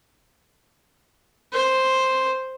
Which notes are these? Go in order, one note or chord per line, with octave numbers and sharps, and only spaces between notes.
C5